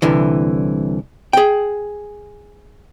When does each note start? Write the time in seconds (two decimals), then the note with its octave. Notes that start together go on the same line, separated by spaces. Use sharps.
0.02 C2 D3 E3
1.33 G#4 G5